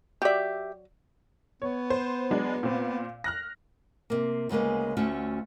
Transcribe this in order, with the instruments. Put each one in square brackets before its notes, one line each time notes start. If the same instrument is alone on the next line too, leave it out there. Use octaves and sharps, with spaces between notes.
[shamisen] F#3 D5 [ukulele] G4 E5
[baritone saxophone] B3 [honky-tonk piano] C#5
[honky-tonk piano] C5
F#3 G#3 D4
A#2 C4
F6 F#6 A#6
[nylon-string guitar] C3 A#3
D2 C#3 G#3 A#3 B3
D2 A3 C#4 F4 F#4